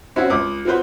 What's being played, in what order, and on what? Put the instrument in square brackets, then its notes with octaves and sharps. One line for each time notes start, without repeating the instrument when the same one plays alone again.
[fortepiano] C4 C#4 E4 F#4
C#2 D6 D#6
F3 C4 F#4 B4 C5